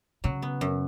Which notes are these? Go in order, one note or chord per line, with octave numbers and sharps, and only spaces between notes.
C#3 F#3
B3
F#2